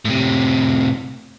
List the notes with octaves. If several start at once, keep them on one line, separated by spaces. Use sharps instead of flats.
A2 C3